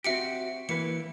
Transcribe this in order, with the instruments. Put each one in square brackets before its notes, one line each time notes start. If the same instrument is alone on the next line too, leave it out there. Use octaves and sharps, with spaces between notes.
[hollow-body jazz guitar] C4 F#4 G4 [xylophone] E5 C#7 D7
[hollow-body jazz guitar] E3 A#3 B4 [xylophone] C#7